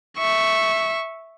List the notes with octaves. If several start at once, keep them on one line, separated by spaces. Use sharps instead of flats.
E5 C#6